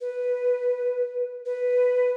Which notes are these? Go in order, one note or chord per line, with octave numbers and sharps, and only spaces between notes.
B4
B4